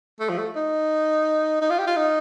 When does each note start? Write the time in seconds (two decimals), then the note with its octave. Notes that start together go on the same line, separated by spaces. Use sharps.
0.20 A3
0.29 F3
0.38 A3
0.56 D#4
1.61 D#4
1.70 F4
1.79 G4
1.87 F4
1.96 D#4